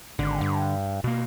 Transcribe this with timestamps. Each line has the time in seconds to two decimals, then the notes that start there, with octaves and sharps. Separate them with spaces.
0.19 G#1 D3
0.41 G2
1.04 B2 A#3